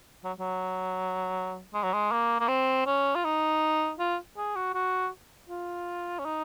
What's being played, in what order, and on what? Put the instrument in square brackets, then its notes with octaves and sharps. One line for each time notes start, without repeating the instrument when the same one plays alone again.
[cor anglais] F#3
F#3
G#3
F#3
G#3
A#3
A#3
C4
C#4
F4
D#4
F4
G#4
F#4
F#4
F4
C#4
D#4